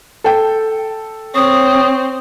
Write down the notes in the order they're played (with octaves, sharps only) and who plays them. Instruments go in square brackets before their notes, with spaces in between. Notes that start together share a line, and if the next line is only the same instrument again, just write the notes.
[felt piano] A4 G5
[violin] C4 [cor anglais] C#5 [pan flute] D#6